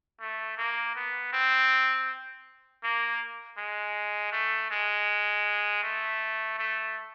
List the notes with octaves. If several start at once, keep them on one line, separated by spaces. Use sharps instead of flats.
A3
A#3
B3
C4
A#3
G#3
A3
G#3
A3
A3